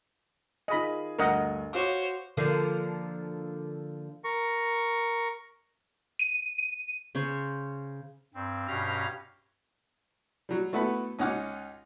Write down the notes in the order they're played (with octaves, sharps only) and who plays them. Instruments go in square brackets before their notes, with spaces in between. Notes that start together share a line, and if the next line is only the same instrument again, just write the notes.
[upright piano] D#3 F4 G#4 [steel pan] D#5 B5
[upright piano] D2 G2 [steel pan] A#4 D#5 F#5
[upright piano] F#4 F5 D6 [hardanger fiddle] C5 C#5
[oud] D3 F3 A#3
[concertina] A#4 C#6
[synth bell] D#7
[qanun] C#3 C5 C#5
[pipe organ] G2 C4
G2 B2 C#4 G4 F5 A#5
[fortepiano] F#3 G3
A3 B3 E4 F#4 A4 B4
C#2 C#4 D#4 F#5 D6 F6